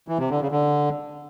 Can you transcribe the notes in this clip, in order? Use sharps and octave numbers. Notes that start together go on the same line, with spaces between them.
E3
C3
D3
C#3
D3